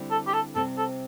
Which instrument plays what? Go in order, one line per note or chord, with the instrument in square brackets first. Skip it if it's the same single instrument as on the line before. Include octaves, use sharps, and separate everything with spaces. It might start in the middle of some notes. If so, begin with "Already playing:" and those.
Already playing: [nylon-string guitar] D3 G3 C4 E4
[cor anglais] A4
G4
A4
[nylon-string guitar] C3 G3 C4 [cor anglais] A4
[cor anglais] A4